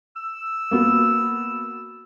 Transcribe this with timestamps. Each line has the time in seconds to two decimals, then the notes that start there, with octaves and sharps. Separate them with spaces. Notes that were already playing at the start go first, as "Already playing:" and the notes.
0.16 E6
0.71 A#3 B3 F#4